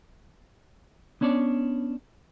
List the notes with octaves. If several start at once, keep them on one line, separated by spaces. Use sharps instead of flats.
B3 C#4 D4 C#5 D5